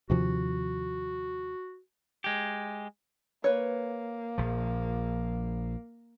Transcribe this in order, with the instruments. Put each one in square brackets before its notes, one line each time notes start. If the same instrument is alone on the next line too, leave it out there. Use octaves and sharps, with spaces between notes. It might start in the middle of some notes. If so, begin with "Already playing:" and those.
[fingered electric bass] D#2 C3 F3 [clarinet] F#4
[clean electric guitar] G#3 G4
[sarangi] A#3 [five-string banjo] B4 C#5
[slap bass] A#1 F3